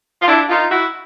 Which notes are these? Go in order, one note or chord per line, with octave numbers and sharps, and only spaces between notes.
F4
D4 E4
D#4 F4
E4 F#4